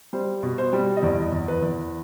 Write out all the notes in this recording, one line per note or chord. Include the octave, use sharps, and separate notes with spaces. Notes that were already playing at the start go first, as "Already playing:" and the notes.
G3 C5
B2
C5
G3
D#5
E2 D5
E2
B4
E2